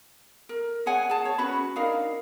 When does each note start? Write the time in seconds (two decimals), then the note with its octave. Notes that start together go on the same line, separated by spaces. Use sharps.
0.49 A#4
0.86 G#4 C#5 F#5 G#5
1.10 G#4 A5
1.25 C#5
1.38 C#4 F#4 B4 B5
1.76 D4 D#4 A#4 F5